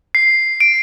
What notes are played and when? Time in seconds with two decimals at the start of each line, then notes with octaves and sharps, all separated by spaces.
0.15 C7
0.60 D7